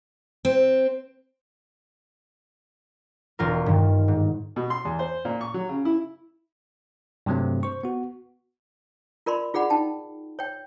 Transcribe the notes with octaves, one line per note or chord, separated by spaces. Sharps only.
C4
E1 F4 A#4
G2 D#3
G#2
B2
C6
E2
C5
A#2
C#6
F#3
C#3
E4
G2 C3 F#3 A3 C4
C5 C#6
B3 F#4
F4 A#4 D5 B5 C6
F4 G#4 D5 F#5 B5
D#4 G5 A5
C#5 G5